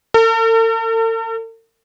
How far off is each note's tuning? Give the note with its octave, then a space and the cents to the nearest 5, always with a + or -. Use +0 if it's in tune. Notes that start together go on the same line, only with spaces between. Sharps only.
A4 +45